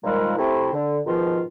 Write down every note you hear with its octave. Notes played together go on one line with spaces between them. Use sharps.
A#2 D#3 F3 G3 G#3
C3 A3 C4 E4
D3
G#2 B2 D#3 F3 F4